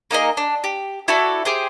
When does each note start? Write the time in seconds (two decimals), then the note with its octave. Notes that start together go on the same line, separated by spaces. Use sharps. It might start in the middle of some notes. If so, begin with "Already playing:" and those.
0.11 A#3 D#4 G#4 D#5
0.37 D4
0.64 G4
1.08 E4 F#4 A4 D5
1.45 G4 G#4 C5